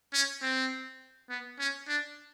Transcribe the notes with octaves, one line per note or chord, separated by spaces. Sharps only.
C#4
C4
B3
C#4
D4